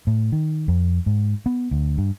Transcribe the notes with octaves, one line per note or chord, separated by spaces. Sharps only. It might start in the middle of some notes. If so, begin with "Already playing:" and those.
A2
D#3
F2
G#2
B3
D2
G2